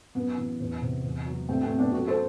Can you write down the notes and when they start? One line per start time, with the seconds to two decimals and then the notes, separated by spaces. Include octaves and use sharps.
0.15 F#2 B3
0.38 E3
0.60 E2
0.81 C3
1.04 E2
1.26 F#3
1.49 G2 A3 C4
1.63 A3 C4
1.71 F#3
1.78 B3 D4
1.92 F#2 F#4 A4
2.08 A4 C5